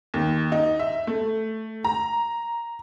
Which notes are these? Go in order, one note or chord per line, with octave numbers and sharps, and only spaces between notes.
D#2
D#4
E5
A3
A#5